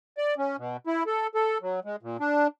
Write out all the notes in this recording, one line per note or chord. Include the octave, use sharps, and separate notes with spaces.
D5
C#4
B2
E4
A4
A4
F#3
G#3
A#2
D4